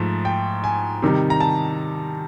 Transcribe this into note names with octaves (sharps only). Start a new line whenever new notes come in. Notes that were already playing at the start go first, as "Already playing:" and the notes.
Already playing: G#2 F3 A3
G5
G#5
C3 D#3 G3
A#5
A5